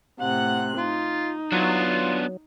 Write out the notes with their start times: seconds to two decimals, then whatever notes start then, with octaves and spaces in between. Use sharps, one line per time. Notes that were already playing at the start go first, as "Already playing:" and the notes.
0.21 A2 C3 F#5 F#6
0.78 D#4 F4
1.52 F#3 B3 D4 F4